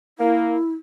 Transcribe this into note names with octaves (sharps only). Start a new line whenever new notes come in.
A#3 E4